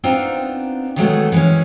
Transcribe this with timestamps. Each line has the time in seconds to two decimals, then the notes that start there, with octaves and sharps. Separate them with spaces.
0.03 B3 C4 D4 D#4 F4
0.96 D#3 E3 F#3 G#3 A3 B3
1.32 E3 G#3 C#4